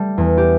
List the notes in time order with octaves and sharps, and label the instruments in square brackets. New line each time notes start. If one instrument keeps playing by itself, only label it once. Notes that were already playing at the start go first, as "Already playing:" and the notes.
Already playing: [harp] G3 A3
E2
G4